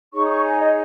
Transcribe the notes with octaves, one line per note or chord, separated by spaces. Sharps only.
D#4 G#4 C#5 C#6
D#6
C#6
G#5
D#5